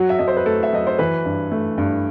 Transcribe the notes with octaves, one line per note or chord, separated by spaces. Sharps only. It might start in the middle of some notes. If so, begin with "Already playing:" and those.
Already playing: F#3 F#4
E5
F#3 D#5
C5
B4
A3 A4
E5
F#3 D#5
C5
E3 B4
G2
A3
G2